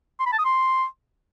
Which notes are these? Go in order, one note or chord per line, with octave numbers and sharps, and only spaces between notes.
C6
B5
A5
D#6
C6